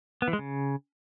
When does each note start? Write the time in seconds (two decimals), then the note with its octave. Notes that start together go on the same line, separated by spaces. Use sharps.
0.22 B3
0.28 E3
0.33 G#3
0.39 C#3